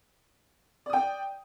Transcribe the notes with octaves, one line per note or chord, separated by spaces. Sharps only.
D5 G5 D#6